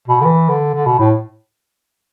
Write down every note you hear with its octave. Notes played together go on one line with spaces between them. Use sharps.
B2
D3
E3
D3
D3
B2
A2